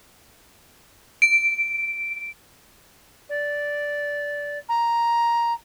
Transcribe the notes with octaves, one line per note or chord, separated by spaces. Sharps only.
D7
D5
A#5